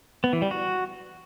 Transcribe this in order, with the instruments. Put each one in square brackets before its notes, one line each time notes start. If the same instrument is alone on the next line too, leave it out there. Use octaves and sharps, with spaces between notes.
[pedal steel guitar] B3
E3
G3
F#4